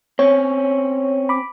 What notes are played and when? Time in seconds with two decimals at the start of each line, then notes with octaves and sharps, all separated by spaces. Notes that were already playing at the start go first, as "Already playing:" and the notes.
0.19 C4 C#4 C#5
1.29 B5 D6